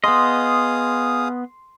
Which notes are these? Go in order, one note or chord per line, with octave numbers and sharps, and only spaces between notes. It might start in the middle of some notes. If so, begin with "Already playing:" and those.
B3 G#4 D#5 F5 C6 D#6